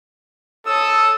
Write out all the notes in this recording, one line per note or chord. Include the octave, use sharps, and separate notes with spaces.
A4 C#5 D#6 E6